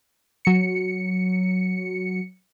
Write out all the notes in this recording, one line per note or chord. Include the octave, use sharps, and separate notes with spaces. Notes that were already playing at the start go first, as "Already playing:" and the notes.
F#3 C#7